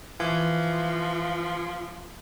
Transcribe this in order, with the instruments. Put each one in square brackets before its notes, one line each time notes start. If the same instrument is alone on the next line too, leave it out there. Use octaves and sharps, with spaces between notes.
[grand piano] E3 [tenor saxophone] F3